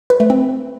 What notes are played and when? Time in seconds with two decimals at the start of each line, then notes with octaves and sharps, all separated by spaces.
0.10 B4
0.20 A3
0.30 C4